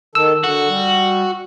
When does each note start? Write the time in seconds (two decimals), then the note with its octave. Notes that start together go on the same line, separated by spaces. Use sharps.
0.15 D#3 A4 E6
0.44 D3 F#4
0.68 G3